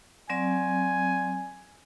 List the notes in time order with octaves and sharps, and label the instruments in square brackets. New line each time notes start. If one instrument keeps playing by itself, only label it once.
[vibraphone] F#3 C4 D5 [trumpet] G#5